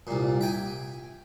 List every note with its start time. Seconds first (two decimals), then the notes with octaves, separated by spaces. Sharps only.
0.07 C2 A#2
0.41 E5 G5 G#5